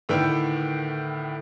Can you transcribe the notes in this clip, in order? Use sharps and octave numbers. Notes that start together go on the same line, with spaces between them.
A2 D3 D#3 B4 G5